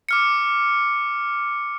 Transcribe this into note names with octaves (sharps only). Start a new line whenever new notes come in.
D6 F6 C#7